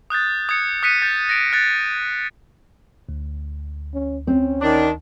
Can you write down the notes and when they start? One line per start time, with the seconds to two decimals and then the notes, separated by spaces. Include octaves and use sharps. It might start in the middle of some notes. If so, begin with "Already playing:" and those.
0.10 D#6 F#6 G6 A6
0.49 D#6 G#6 C#7
0.83 D#6 F#6 B6 C#7 D#7
1.02 G6 A6
1.29 A#6 D7 D#7
1.53 F#6 A6
3.09 D2
3.94 C#4
4.27 C4 C#4
4.62 D#3 D4